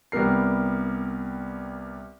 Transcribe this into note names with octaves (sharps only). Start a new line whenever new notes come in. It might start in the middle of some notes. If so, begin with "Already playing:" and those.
C2 G3 B3 A#4 C7